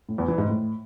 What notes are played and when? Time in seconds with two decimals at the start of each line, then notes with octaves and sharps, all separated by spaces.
0.09 A2
0.18 E2
0.28 E3
0.38 G#2
0.48 A2